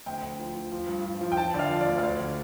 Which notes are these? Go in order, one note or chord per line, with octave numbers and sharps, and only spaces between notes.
D2 G5
D2
F3
F3
F3
G2
F3
F3
G5
F3 A5
D3 D5 F5
F3
D5
D2
F5
D2 D5
D3